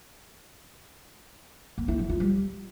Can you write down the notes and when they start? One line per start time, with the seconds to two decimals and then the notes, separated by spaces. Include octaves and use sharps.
1.78 A#3
1.88 E4
1.99 F#3
2.09 F4
2.20 G3